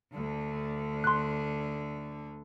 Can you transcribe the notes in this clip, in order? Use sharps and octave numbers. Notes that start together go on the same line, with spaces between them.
D2 D3
C6 F#6